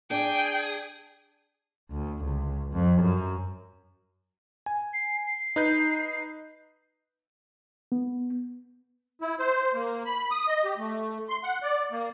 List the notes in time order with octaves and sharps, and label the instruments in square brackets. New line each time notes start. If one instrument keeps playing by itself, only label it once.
[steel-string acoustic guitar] D4 D5 [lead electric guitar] G#4 [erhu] G5
[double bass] D2
C#2
F2
F#2
[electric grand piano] G#5
[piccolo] C7
C7
[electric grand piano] D#4 B4 G6
[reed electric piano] B3
[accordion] E4
C5
A#3
B5
D#6
D#5
G4
A3
C6
F#5
D5
A#3